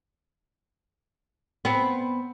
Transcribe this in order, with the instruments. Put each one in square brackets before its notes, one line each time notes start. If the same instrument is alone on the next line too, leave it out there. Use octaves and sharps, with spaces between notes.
[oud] B3 C4